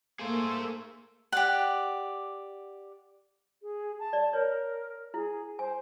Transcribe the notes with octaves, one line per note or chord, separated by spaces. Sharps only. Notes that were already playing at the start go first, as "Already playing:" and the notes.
A3 A#3 G#4 C5
G4 D5 F#5
G#4
A5
D5
A#4 C#5
E4 G#4
C5 G#5